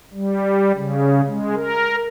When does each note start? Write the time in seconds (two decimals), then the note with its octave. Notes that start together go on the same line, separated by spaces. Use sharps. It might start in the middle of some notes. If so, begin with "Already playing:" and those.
0.14 G3
0.75 C#3
1.26 G#3
1.55 A#4